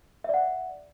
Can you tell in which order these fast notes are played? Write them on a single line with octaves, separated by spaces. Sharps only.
E5 D5 F#5